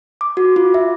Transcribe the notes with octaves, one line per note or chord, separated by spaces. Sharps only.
D6
F#4
F4
E5